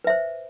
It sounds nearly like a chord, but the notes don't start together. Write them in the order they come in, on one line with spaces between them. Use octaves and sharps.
B4 E5 C5